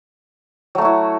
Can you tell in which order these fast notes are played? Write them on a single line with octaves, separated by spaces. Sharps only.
F#3 A3 F#4 E4